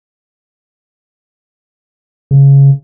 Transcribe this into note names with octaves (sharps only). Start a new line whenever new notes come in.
C#3